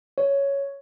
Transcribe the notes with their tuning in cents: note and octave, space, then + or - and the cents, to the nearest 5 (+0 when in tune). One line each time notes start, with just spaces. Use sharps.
C#5 +5